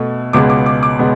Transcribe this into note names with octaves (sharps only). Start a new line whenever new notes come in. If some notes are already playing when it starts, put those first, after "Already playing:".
Already playing: B2 A3
C#2 B2 G#3 B3 D6
D6
D6
D6
B2 G#3 B3